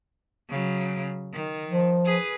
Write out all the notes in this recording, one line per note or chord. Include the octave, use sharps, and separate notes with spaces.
C#3 F#3
D#3
F3
G#4 B4